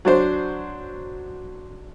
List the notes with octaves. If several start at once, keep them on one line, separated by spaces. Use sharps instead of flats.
F#3 D4 C5